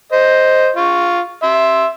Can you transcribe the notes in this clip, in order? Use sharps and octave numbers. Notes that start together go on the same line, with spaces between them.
C5 D#5
F4 C#6
E5 C6